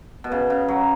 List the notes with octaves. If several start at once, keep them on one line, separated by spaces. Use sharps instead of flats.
B2
C#3
C#3
F#3